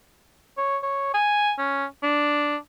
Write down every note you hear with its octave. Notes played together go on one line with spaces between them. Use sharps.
C#5
C#5
G#5
C#4
D4